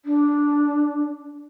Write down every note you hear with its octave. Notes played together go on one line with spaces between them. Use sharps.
D4